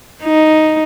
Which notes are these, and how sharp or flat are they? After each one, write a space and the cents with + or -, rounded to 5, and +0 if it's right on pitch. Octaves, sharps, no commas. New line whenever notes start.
D#4 +0